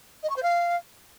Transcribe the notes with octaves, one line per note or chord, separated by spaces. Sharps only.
D#5
C#6
C5
F5